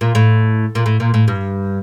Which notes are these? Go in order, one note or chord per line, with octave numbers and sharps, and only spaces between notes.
A#2
A2
A#2
A2
A#2
A2
G2